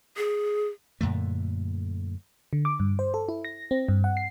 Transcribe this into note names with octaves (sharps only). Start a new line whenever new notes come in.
G#4
F#2 A#2 D3 A3
D3
D6
G2
C5
A4
E4
A#6
C4
G2
F#5
C7